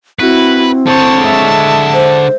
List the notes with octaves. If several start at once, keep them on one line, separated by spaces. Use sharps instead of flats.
C4 E4 F#4 B4
D3 C5 C#5 A5
G#3 E5
C5